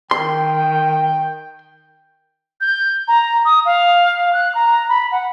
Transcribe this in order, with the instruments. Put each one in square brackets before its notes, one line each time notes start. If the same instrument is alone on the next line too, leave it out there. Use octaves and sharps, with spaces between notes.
[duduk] D#3 [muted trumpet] G5 [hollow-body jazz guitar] C6
[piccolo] G6
A#5
D#6
F5
F#6
A#5
B5
F#5